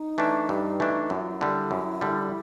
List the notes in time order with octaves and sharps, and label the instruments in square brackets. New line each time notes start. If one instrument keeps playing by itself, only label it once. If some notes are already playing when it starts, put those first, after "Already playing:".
Already playing: [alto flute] D#4
[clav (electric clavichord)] E3 A3 D4
G2
E3 A3 D4
[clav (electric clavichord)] F#2 [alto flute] E4
[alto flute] F4
E4
[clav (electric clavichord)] D3 G3
F#2
D3 G3